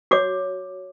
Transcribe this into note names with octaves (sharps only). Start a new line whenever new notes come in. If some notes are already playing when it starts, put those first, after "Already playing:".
F#4 C#5 D6